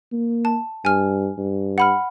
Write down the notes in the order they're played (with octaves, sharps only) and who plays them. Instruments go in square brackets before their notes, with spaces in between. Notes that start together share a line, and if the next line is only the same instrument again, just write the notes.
[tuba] A#3
[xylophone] A5
[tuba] G2 [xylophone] G#5 F6
[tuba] G2
[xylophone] F#5 B5 F6